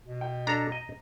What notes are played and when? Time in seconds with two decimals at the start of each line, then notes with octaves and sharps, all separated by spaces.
0.06 B2
0.21 G5
0.47 D4 A4 A#5
0.72 D#5